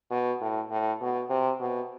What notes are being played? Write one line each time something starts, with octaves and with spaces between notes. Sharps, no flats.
B2
A2
A2
B2
C3
B2